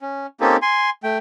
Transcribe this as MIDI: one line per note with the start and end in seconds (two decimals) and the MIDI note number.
0.01 0.27 61
0.41 0.56 58
0.41 0.56 60
0.41 0.56 61
0.41 0.56 63
0.41 0.56 67
0.41 0.56 69
0.62 0.90 80
0.62 0.90 84
1.04 1.18 57
1.04 1.18 79